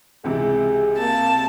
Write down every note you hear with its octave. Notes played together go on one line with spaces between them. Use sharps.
C#2 C3 E3 G#4
A#3 A5